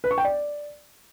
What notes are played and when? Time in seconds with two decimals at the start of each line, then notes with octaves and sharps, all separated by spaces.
0.04 B4
0.11 C#6
0.18 G5
0.25 D5